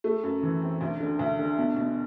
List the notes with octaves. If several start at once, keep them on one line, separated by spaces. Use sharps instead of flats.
A3
F#2
E3
C4
D2
D3
D2
D3
B2
B2